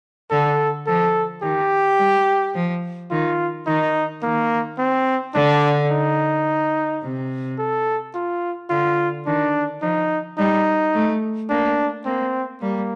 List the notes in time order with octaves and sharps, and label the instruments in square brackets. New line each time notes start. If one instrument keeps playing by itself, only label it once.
[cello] D3 [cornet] A4
[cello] F3 [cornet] A4
[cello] D#3 [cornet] G4
[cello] G3
F3
[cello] D#3 [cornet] F4
[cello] D#3 [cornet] D#4
[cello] D#3 [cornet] A#3
[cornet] C4
[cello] D3 [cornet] D4
[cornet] D#4
[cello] C3
[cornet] A4
F4
[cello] D3 [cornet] F4
[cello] D#3 [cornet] D4
[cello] F3 [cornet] D#4
[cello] G3 [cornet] D#4
[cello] A3
[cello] A#3 [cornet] D4
[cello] A#3 [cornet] C4
[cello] G3 [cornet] A#3